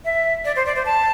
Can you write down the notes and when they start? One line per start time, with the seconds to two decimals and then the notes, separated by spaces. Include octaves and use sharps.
0.05 E5
0.45 D5
0.56 C5
0.66 D5
0.76 C5
0.85 A5